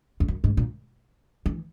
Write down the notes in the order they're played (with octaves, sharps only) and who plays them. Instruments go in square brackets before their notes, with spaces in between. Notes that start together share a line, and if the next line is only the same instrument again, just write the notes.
[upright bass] E2
F#2
G#2
A#2
E3